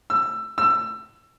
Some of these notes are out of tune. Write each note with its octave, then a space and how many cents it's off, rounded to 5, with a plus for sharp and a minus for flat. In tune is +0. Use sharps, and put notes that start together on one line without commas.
E6 +20
E6 +25